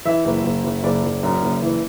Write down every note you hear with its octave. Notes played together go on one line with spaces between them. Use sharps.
E3 E5
F#1
F#1
F#1
F#1 D5
F#1
F#2
F#1
E3